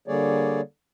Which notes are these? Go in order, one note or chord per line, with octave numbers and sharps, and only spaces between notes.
D3 G3 A#3 G#4 C#5 D5